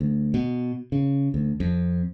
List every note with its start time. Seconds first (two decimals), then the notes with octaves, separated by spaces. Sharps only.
0.01 D2
0.34 B2
0.92 C#3
1.34 D2
1.60 F2